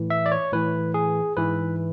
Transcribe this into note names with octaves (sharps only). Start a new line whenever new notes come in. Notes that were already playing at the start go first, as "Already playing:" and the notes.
Already playing: A2 E3
E5
D5
C#5
A2 E3 B4
G#4
G#2 E3 B4